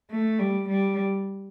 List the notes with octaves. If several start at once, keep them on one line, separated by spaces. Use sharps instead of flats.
A3
G3
G3